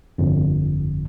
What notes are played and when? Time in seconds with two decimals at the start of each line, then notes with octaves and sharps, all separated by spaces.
0.18 G1 F2